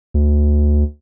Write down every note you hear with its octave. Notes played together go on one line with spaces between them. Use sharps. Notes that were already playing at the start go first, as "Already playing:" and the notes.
D2